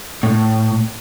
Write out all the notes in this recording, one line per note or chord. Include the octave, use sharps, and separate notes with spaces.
A2